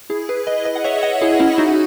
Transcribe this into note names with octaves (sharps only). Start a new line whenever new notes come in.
E4 G#4
G#4 B4
B4 D#5
B4 D#5
F#5
C#5 E5
D#5 F#5
E4 G#4
C#4 E4
D#4 F#4